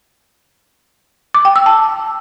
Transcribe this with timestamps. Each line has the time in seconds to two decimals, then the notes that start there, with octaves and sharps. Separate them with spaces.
1.34 D6
1.45 G5
1.56 E6
1.66 A5